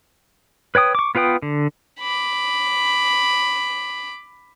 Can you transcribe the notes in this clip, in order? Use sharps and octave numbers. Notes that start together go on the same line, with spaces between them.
B4 C#5 G5 D#6
C#6 D6
B3 F4 B4 G5 D#6
D3
B5 D6